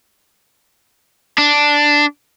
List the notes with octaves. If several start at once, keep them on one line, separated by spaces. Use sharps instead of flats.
D4